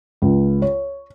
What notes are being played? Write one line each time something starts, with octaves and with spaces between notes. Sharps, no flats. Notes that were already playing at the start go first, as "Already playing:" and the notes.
C#2
C#5